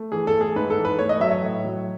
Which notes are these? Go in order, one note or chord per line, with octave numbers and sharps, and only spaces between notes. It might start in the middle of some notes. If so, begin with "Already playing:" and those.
Already playing: A3
E3 G#4
A4
A3
G#4
G#2 B4
A4
E3
B4
A3 C#5
D#5
F#3 E5
C#5
A2
F#3